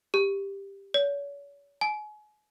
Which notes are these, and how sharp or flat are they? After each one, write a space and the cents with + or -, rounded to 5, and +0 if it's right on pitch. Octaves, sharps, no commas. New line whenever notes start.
G4 +10
C#5 +40
G#5 +35